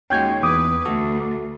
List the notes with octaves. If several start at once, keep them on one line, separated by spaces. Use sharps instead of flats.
D#2 G#3 C#4 F#4 C#5 G5 G6 G#6
E2 B4 D6 D#6
D2 F#4 A4